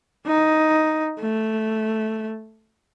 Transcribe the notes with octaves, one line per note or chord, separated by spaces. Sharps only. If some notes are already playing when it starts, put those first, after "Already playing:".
D#4
A3